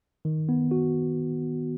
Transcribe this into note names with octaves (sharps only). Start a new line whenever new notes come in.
D#3
B3
F#4